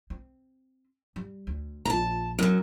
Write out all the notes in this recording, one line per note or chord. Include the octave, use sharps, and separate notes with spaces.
C4
G3
D2
A#1 F4 A5 A#5
F#2 F#3